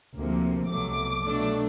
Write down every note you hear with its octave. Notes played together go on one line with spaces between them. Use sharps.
D2 C3 F3 A#3
C2 B2 F#3 A3 D6
B2 F#3 A3 D4